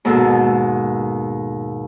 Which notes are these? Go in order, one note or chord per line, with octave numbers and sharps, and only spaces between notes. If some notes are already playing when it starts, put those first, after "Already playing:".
D#2 G#2 B2 A4 E6